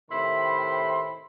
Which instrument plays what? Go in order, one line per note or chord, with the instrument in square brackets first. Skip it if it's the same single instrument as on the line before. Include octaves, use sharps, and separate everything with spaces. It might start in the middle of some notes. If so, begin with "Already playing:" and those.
[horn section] A2 C3 D#3 E4 B5 C6